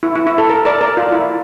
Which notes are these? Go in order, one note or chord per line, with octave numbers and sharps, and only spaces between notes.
E4
E4
E4
A4
A#4
A#4 D5
A#4 D5
F4
E4